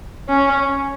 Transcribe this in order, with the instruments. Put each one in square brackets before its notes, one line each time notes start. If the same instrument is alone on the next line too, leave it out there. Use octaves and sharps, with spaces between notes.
[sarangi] C#4